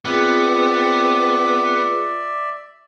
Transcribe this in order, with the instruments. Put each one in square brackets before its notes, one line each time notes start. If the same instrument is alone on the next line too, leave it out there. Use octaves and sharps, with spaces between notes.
[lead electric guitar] B3 [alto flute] C4 [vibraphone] F4 G#4 [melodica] D5 E5